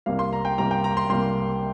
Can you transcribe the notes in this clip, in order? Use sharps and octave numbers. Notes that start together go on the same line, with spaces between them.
C2 C3 G3 A#3 F5
C6
A#5
G5
C2 C3 G3 A#3 A#5
G5
A#5
C6
C2 C3 G3 A#3 C6